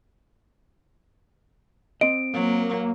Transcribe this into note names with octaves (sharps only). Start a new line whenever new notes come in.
C4 D#5 D7
F#3 A#3